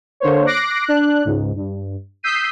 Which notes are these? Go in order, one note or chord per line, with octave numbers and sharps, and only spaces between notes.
D3 A#3 C5 C#5
D6 F#6 A#6 C7 D7
D4 F#6
C#2 G#2
G2
D#6 E6 G6 B6 C7 D#7